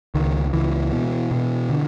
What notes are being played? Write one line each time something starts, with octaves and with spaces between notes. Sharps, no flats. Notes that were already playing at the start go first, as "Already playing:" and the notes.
C#2 D#3
C#2 E3
B2
B2
D3